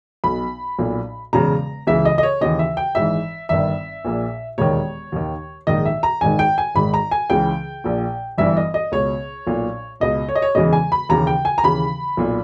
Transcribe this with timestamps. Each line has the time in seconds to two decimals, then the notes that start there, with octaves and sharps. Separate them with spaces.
0.24 B1 B2 B5
0.79 B1 A#2
1.33 E1 E2 C#3 A#5
1.87 C#2 C#3 E3 E5
2.05 D#5
2.18 D#5
2.23 C#5
2.41 D#2 C#3 E3 D#5
2.59 E5
2.77 G5
2.95 G#1 G#2 E3 E5
3.49 G1 G2 D#3 E5
4.05 A#1 A#2
4.58 E1 D#2 D#3 C#5
5.12 D#2 D#3
5.67 A#1 G#2 D#3 D#5
5.85 E5
6.03 A#5
6.21 G#1 G#2 D#3 G#5
6.39 G5
6.58 G#5
6.75 G#1 G#2 D#3 B5
6.94 A#5
7.11 G#5
7.30 C#2 C#3 E3 G5
7.84 A#1 A#2
8.38 G1 G2 E3 E5
8.57 D#5
8.74 D#5
8.92 C#2 B2 C#5
9.47 B1 A#2
10.00 C#2 B2 D#5
10.29 C#5
10.35 D#5
10.42 C#5
10.55 E1 E2 C#3 E3 D#5
10.73 G#5
10.92 B5
11.09 D#2 C#3 E3 A#5
11.27 G5
11.45 G#5
11.58 A#5
11.63 D#2 C#3 E3 B5
12.17 B1 A#2